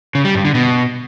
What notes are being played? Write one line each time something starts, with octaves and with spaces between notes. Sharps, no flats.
C#3
G3
G2
D3
B2